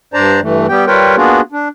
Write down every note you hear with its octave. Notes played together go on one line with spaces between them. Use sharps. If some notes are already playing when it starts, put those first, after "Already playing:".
G2 D4 C5 D5 A5 A#5
G2 E3 A3
G3 B3 G4 G5
G3 F4 A#4 B4 C#5 G5
A#3 B3 D4 F4 F#4 G#4
D4